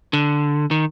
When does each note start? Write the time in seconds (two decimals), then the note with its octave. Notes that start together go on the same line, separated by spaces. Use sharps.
0.13 D3
0.71 D#3